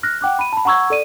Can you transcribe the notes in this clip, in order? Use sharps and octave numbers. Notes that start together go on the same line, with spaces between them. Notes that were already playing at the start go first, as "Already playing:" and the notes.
F6 F#6 A#6
F#5 G5 D6 F#6
B5 D#7
A5 B5
F#5 A#5 C#6 E6 G#6
A4 D5 D#7